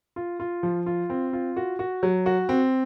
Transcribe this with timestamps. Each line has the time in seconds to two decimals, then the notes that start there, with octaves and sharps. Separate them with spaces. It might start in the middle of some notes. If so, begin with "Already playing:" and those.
0.16 F4
0.40 F4
0.63 F3
0.86 F4
1.10 C4
1.33 F4
1.56 F#4
1.79 F#4
2.03 F#3
2.26 F#4
2.49 C4